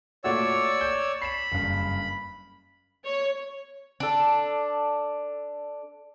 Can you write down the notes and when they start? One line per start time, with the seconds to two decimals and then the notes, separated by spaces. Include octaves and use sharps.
0.24 A#2 A3 F#4 C#5 D5 E6
0.81 G6
1.22 B5 C7 E7
1.52 F#1 G2
3.05 C#5
4.00 D4 A4